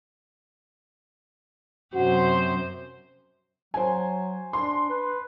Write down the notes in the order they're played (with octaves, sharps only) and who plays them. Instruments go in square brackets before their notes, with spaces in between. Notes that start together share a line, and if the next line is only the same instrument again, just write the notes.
[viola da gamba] F#2 C3 C5 [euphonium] F#4
[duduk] F#3 [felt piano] C5 G#5
[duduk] D4 [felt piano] C6
[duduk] B4